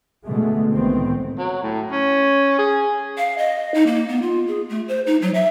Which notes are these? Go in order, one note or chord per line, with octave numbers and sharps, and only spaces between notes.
B2 D3 G#3 A3
C2 A2 D#3 E3 B3 C4
F#3
A2
C#4
G#4
F5
D#5
D#4
A#3
B3
F4
G#4
A3
C5
D#4
F#3
E5